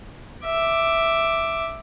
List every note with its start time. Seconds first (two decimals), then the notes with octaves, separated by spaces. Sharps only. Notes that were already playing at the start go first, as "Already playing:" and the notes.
0.45 E5 D6